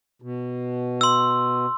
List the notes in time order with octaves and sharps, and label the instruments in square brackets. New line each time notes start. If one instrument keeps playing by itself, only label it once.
[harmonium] B2
[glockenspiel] C6 E6